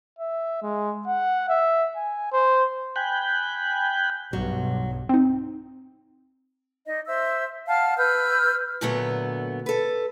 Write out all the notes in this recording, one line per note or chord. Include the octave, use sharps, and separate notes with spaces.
E5
G#3
F#5
E5
G#5
C5
G5 G#5 B5 F#6 G6
B1 G2 F#3
C4 D#4
D#4 D5 D#5
C5 E5 E6
F5 F#5 A5 F6
B4 E6 F6 G6
A#2 D3 F#3 A3 B3
A4 B4